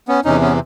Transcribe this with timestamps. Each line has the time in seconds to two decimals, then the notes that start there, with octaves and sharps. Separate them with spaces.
0.08 B3 C#4
0.25 E2 C3 E3 C#4 D#4
0.41 B3 C#4